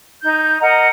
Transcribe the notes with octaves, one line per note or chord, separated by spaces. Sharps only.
D#4 G6
A#4 D#5 F#5 A#5